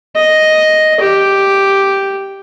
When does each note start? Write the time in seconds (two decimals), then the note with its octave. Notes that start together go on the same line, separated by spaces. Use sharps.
0.15 D#5
1.00 G4